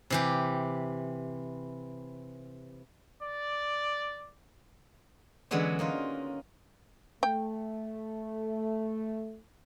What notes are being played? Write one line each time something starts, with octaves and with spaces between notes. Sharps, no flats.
C3 E3 G4
D5
D3 E3 F#3 G#3 B3 C#4
A#3 D#4 F4
A3 G5